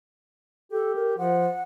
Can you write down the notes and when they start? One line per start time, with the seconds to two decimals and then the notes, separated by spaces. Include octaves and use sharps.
0.72 G4 A4
0.95 A#4
1.18 F3 F#5